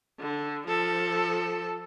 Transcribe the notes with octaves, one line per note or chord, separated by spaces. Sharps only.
D3
F3 A4